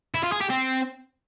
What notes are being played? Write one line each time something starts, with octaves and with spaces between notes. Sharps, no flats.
E4
F4
G#4
G4
C4